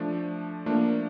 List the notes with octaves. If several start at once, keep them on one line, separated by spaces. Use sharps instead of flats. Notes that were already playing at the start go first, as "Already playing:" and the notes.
Already playing: F3 A3 D4
F3 A3 A#3 D4